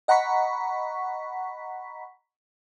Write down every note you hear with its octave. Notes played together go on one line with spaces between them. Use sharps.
D#5 F#5 A#5 B5 C#6 B6